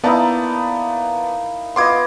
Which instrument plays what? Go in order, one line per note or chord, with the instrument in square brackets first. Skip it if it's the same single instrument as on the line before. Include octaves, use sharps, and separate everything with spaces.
[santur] A#3 D#4 E4 [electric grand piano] B3 D5 A5
[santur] B3 F4 D#5 [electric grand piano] C6 D6 G#6